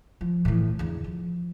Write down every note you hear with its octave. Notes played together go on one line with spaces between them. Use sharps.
F3
A2 E3
E2 D3
F3